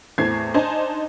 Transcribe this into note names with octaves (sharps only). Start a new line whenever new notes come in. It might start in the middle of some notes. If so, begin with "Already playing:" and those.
E2 A2 C4 G#6 C7
D4 D#4 C5 G#5 A5